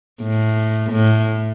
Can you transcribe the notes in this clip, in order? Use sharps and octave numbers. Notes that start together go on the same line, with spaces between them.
A2
A2